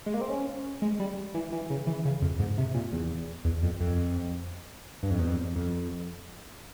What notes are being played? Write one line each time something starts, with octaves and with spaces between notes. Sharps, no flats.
G#3
A#3
C4
C#4
G#3
G3
E3
E3
C#3
E3
C#3
F2
G#2
C3
A#2
E2
E2
F2
F2
G2
F2
E2
F2
F2